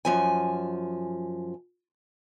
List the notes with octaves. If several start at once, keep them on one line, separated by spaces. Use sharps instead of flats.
F#2 F3 G#5